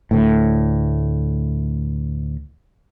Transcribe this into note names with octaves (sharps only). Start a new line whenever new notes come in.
D2 A2